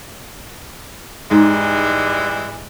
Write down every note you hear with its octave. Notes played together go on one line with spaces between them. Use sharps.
G#2 E3 G3 G#3